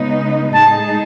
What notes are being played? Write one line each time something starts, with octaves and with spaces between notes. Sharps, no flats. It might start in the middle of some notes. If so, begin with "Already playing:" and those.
Already playing: C#3 G#3 B3 D#4
A2 G#3 D#4 G#4 A5